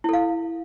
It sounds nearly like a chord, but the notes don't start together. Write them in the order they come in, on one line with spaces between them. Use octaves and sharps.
E4 A4 F5